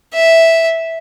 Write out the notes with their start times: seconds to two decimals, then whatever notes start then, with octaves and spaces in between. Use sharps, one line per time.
0.14 E5